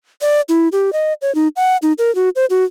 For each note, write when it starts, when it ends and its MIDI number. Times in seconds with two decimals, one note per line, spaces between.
0.21 0.41 74
0.49 0.68 64
0.72 0.93 67
0.93 1.13 75
1.22 1.34 73
1.35 1.48 63
1.56 1.77 78
1.82 1.93 63
1.98 2.13 70
2.15 2.29 66
2.36 2.45 72
2.50 2.64 66